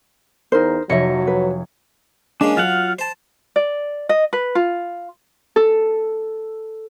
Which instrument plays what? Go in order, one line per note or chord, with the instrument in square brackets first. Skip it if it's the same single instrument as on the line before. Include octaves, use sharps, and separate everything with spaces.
[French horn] E2 [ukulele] D#4 A#4 C5
[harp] F1 C#5 C#7 [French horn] F#3 [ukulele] D#5 E5
[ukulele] B4
[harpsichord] G#3 A#3 C#4 [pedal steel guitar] D4
[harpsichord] F#3 [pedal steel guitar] F4 F5 F#5
[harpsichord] C5 A5
[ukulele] D5
D#5
B4
F4
[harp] A4